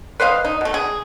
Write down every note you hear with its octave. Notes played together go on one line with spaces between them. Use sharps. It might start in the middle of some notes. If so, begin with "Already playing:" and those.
B4 C5 D#5 F5
D#4
B2 A3
G#4